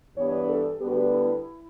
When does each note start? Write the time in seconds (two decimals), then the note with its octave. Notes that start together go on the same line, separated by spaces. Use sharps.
0.17 G2 E3 B3 D4 G4 C#5
0.49 A4
0.80 D2 D3 G3 B3 G4
0.88 F#4
0.97 G4
1.13 E4